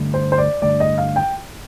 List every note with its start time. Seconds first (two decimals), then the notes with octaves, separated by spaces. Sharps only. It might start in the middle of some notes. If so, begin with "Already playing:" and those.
Already playing: G2 D3 A3
0.14 C5
0.32 C5
0.38 D5
0.62 G2 D3 A3 D5
0.80 D#5
0.98 F5
1.16 G5